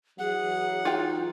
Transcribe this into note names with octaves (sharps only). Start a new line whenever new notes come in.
E3 F#3 G#4 F#5
D#4 F4 G5